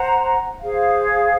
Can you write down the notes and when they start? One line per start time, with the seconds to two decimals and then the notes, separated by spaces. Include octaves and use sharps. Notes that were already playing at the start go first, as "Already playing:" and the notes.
Already playing: C5 F#5 A#5
0.61 G#4 C5 F5